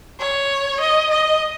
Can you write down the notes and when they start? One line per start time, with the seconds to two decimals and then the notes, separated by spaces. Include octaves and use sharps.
0.19 C#5
0.80 D#5
1.11 D#5